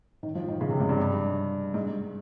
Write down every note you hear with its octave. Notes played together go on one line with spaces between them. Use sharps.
D#3
F3
D#3
C#3
C3
G#2
G2
G#2